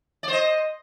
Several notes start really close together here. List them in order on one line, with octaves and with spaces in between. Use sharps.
D5 C5 D#5